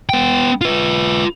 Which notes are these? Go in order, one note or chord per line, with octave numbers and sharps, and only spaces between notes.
B3 G5
F4 B4